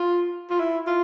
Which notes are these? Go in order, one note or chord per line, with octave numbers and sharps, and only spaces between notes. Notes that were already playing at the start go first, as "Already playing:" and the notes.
Already playing: F4
F4
E4
F4